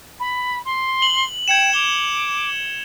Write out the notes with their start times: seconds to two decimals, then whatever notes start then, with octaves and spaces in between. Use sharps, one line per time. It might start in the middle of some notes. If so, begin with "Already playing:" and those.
0.19 B5
0.65 C6
1.02 F#7
1.48 G5 G#6 C#7 E7
1.73 D6 F7 G7